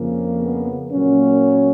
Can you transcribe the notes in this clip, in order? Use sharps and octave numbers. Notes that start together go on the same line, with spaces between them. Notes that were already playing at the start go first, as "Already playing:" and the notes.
Already playing: F2 C#3 F3 A#3
B3
A#2 F#3 A#3 C#4